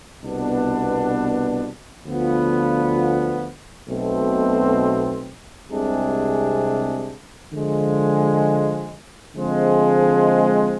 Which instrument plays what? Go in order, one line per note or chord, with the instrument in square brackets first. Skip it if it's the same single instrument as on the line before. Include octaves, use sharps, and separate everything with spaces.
[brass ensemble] C2 B2 B3 D4
D2 D3 F3 B3 F4
B1 B2 A3 C4
C2 C3 G#3 D4 G#4
D3 F3 G#3
D3 F3 G#3 C4